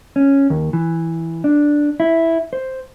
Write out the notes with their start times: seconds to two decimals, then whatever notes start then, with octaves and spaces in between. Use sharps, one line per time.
0.16 C#4
0.50 D#2
0.73 E3
1.44 D4
2.00 E4
2.53 C5